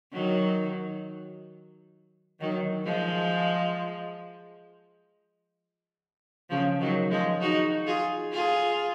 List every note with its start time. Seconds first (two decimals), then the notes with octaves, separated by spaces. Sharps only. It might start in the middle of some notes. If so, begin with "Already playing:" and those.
0.13 D#3 F#3
2.40 D#3 F#3
2.85 F3 G#3
6.50 C#3 F3
6.80 D#3 F#3
7.11 F3 G#3
7.41 D#4 F#4
7.86 F4 G#4
8.32 F4 G#4